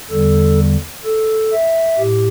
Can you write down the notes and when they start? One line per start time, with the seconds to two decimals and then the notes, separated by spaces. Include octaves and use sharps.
0.10 E2 D3 G3 A4
1.05 A4
1.52 E5
1.99 A2 G4